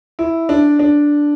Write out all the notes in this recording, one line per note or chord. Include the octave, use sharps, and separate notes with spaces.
E4
D4
D4